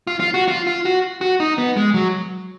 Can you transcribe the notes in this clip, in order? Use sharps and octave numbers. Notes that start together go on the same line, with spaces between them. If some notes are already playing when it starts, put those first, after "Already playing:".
F4
F4
F#4
F4
F4
F#4
F#4
D#4
B3
G#3
F#3